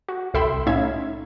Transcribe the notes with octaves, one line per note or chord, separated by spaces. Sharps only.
F#4
C2 A4 E5 G5 B5 C6
A2 C#4 D#4 E5 F5 G#6